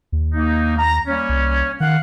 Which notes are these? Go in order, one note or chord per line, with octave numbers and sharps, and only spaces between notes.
D#2
A#3 D#4
A#5
G3 A#3 C#4
C2
D#3 F5 F#5